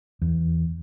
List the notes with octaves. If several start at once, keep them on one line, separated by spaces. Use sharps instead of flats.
E2